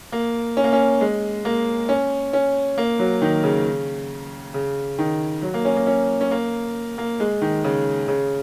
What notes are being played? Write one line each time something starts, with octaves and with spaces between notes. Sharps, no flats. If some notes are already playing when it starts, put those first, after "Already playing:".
A#3
C#4
A#3
C#4
G#3
A#3
C#4
C#4
A#3
F#3
D#3
C#3
C#3
D#3
F#3
A#3
C#4
A#3
C#4
C#4
A#3
A#3
G#3
D#3
C#3
C#3